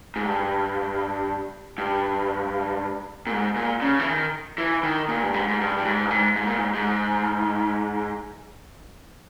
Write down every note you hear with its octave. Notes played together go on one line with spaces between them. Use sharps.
G#2
G2
G2
A#2
G#2
A#2
C#3
E3
D#3
E3
D#3
A#2
G2
G#2
G#2
G2
G2
G#2
G2
G#2
G#2
A#2
G#2
G#2